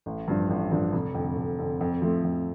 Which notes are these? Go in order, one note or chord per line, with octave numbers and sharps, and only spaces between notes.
A1
G2 F3 D4
A1
G2 F3 D4
F1
F2 D3
F1
F2 D3
F2
F3 A3 C4
F2